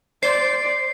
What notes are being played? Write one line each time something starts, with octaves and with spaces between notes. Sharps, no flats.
C5 D5 C7